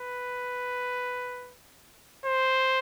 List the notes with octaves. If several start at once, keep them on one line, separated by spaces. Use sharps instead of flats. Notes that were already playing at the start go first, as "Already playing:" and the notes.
Already playing: B4
C5